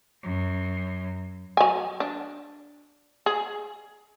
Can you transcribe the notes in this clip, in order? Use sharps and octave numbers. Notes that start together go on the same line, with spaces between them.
F#2
F#3 G#5
D4
G#4